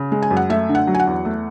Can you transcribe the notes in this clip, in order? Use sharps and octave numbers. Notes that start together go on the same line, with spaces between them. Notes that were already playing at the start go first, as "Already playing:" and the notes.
Already playing: C#3
G#3
G#5
F#2
F#5
A3 E5
D3
F#5
F#3
G#5
F#5
E2
A3